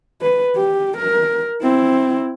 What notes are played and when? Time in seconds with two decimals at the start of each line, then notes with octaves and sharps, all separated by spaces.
0.21 B4
0.56 G4
0.97 A#4
1.62 C4 E4